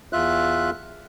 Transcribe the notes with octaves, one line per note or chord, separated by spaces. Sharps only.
E2 F4 E5 F#6